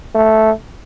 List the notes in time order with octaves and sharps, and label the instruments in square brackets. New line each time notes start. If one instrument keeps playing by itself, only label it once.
[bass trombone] A3